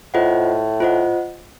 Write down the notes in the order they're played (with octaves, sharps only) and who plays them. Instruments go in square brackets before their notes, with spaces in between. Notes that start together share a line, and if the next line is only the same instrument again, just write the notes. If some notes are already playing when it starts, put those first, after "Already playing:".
[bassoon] A2 [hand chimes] F4 C5 D#5 F#5
[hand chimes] F4 C5 D#5 F#5